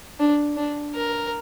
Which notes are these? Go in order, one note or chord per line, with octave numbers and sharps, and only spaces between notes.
D4
D4
A#4